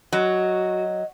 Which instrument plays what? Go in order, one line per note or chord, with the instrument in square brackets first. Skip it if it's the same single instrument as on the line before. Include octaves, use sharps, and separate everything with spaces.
[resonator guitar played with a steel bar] F#3 [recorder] F#4 [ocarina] D#5